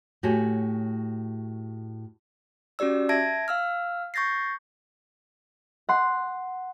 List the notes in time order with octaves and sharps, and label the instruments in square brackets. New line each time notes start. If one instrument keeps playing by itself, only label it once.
[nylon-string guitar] A2 F#4 G4 A4 C#5 G#5
[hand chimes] C#4 F#4 G4 D5 E6
E5 A5 G#6 A#6 D7
F5 E6 F6
C#6 G6 A6 A#6 C7
[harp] F#5 C6